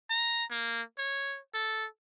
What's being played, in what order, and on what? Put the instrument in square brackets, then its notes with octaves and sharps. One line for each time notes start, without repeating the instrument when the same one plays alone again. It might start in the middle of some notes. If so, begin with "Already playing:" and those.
[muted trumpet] A#5
A#3
C#5
A4